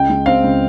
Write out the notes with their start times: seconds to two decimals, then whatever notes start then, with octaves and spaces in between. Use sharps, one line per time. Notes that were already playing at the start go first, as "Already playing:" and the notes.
Already playing: C#2 G5
0.09 G#3
0.26 C4 F5
0.44 C#2